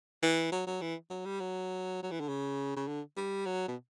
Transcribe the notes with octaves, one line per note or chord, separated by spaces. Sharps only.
E3
F#3
F#3
E3
F#3
G3
F#3
F#3
E3
D3
C#3
C#3
D3
G3
F#3
B2